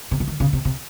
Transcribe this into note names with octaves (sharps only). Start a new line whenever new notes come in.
C3
C#3
D#3
C#3
C3
C3